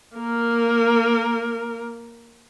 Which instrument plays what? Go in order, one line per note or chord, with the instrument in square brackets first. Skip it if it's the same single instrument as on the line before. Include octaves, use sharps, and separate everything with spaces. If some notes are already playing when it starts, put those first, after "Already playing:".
[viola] A#3 A#4